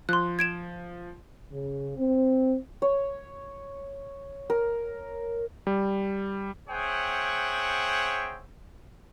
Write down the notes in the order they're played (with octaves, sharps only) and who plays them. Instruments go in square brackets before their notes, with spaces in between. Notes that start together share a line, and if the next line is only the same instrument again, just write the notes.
[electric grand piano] F3 [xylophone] C6 F#6
[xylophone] G#6 D7 E7
[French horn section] C#3
C4
[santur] C#5
A#4
[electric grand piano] G3
[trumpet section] C4 G#4 C#5 E5 F#5 G5